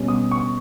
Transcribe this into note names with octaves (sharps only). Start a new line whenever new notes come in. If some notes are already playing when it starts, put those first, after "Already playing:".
Already playing: B2 G3 C#4
D#6
C#6